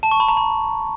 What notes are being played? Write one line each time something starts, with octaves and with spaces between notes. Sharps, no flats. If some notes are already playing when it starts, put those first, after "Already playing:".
A5
C#6
B5
A#5
B5